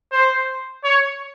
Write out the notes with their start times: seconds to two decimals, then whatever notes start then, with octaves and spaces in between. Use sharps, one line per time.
0.12 C5
0.84 C#5